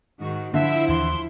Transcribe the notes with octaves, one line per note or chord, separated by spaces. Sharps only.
G#2 D#3 F#4
D3 F3 E4 C5 E5
D#2 E3 C6